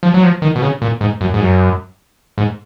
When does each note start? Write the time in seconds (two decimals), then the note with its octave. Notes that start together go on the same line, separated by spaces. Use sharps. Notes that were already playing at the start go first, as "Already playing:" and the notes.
0.03 F3
0.14 F#3
0.23 F3
0.42 D#3
0.56 B2
0.62 C#3
0.82 A#2
1.01 G#2
1.21 F#2
1.34 G#2
1.40 F#2
2.38 G#2